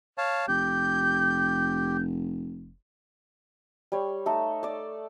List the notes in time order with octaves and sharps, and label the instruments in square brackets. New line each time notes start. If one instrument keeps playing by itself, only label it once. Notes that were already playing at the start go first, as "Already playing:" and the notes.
[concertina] C#5 F5 A5
[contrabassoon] F1 [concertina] G4 [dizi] G6
[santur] G3 C#5
A3 D#4 A4
D5 A5